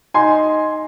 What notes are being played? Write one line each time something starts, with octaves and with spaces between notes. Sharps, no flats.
D#4 G#5 C6